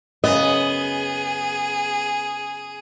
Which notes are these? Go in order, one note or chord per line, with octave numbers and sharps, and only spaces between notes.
F#2 C#3 B3 G#4 D#5